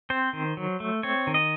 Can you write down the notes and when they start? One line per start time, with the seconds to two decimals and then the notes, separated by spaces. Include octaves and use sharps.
0.10 C4 C5
0.33 D#3
0.57 F#3
0.80 A3
1.03 C4 C#5
1.27 D#3
1.34 D#5